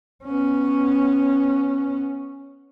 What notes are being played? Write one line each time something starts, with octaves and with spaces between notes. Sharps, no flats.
B3 C#4